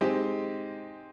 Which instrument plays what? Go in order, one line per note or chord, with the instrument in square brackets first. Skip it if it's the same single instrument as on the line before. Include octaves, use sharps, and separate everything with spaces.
[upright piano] G#3 C4 D#4 G4